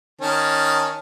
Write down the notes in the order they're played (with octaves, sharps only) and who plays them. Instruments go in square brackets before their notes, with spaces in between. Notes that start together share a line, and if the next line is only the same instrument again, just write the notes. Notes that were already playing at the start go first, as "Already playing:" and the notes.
[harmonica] D#3 C#4 A5